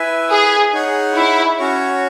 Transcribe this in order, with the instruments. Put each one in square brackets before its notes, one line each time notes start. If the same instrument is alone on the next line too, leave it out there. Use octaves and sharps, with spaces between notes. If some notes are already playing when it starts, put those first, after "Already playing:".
Already playing: [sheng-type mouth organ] E4 B4 E5 G#5
[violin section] G#4
[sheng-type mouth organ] D#4 G#4 C#5 F#5
[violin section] E4
[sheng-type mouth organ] C#4 F#4 C#5